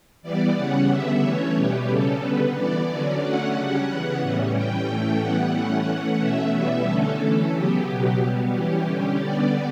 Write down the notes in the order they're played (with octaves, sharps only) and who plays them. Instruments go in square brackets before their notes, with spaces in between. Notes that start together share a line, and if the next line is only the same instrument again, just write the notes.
[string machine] E3 G3 B3 D5
C#3 G3 C#4 F#5
D3 G3 B3 E5
E3 A3 C#4 C#5
B2 G3 B3 G4
C#3 G3 C#4 A4
D3 G3 B3 B4
E3 B3 D5
D3 F#3 C#4 D5
D3 F#3 A3 C#4 F#5
C#3 G3 C#4 F#5
C#3 E3 B3
A2 E3 G3 C#4
E3 G3 C#4 G5
A2 E3 A3 C#4
E3 G3 B3 F#5
E3 A3 C#4 F#5
E3 A3 C#4 F#5
B2 A3 C#4 E5
E3 G3 B3
D3 A3 C#4 A4
E3 A3 C#4
C#3 F#3 B3 G4
B2 F#3 B3
B2 G3 B3
E3 G3 C#4 G4
D3 G3 C#4 G4
D3 G3 B3 D5